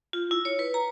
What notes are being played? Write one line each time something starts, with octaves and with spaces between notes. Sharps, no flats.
F4
E4
C#5
B4
A#5